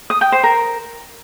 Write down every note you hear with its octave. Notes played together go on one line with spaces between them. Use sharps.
D#6
G5
C5
A#4